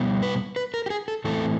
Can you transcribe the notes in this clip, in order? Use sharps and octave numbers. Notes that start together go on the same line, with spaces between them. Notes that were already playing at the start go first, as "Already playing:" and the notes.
Already playing: B2 G3 B3
B4
B4
A#4
G4
G#4
A4
A2 E3 A3 C4 A4